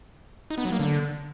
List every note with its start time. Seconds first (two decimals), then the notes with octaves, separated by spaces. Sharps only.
0.50 D#4
0.58 B3
0.65 F#3
0.72 A#3
0.79 D3